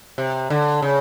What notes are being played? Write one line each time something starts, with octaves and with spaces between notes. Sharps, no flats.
C3
D3
C#3